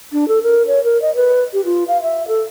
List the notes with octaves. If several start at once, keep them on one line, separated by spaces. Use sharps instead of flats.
D4
A4
A#4
C#5
A#4
D#5
B4
G4
F4
F5
E5
A4